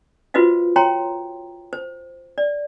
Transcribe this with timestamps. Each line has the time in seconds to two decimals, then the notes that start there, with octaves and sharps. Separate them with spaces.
0.34 F4 F#4 B4 C5 D#5 F5
0.76 C#5 G5 A#5 C6
1.73 C5
2.38 D5